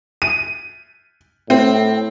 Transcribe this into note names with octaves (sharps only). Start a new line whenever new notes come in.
D#7
A2 C4